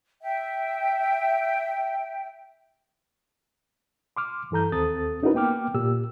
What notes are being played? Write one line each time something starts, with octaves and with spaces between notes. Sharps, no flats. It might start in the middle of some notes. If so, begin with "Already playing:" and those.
E5 G5
C6 D6 F6
G2 E3 A4 A#5 G6
D#2 C4 A4 D#6 A6
C#4 D#4 E4 F#4 A#4 B4
A#3 B3 G5 D6 F6
A#2 G4 E6